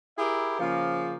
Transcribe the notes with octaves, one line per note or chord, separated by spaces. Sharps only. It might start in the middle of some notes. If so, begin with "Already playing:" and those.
E4 G4 G#4 A#4 E5 B5
C#3 F3 A#3